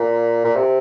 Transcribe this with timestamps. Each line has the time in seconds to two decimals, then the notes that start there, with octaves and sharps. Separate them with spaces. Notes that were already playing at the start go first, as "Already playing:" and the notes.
Already playing: A#2
0.45 A#2
0.56 C3